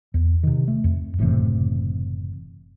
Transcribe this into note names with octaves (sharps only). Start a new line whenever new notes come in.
E2
C3 D#3
A3
F2
F#1 A2 C3 E3